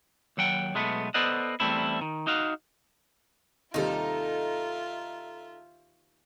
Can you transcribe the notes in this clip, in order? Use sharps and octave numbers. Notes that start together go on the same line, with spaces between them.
D#2 F#3 F#5 G5
B1 G#3 A3 B3
B3 A4 C5 D5 D#5 F#5
E2 G3 A3 C4 E4
D#3
D#4 F#4 F5
D#2 C3 G3 D#4 F4 A4 E5